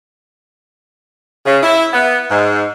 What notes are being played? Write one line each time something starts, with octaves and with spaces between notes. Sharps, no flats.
C#3
E4
B3
G#2